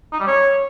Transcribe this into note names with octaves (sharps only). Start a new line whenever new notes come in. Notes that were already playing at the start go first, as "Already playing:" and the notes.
D#4
G3
C#5